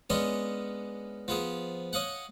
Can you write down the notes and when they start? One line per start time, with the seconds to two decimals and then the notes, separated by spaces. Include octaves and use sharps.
0.10 G#3 B3 C#4 D4 D#5
1.28 F3 B3 G#4
1.93 C#5 D#5 F5 F#5